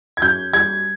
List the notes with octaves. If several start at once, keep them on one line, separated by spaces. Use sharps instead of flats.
G#6
F#2 G6
G3 G#6